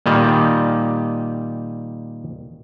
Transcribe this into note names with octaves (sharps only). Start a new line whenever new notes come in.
A#2 D#3 G3